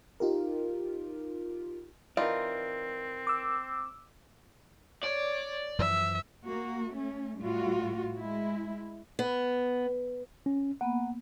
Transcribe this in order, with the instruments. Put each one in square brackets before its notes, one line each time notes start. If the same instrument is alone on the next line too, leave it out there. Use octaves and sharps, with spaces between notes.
[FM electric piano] D#4 F4 G4 A#4
[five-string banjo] E3 D#4 F4 [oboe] C4 [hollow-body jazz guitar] A#4 D5
[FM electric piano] D6 E6
[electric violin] C#5 [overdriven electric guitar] D5
[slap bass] F#2 E3 F3 [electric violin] E5
[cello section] A#3 F#4
A3 C#4
A2 G3 F4 F#4
G#3 E4
[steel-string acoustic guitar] B3
[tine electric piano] C#4
[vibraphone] A#3 B3 B5 [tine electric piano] F#5